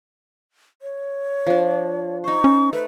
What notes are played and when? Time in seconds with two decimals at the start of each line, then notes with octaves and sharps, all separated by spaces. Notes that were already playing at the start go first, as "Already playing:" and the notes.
0.82 C#5
1.47 F3 D4
2.24 D#4 C5 C#6
2.44 C#4
2.73 A3 B4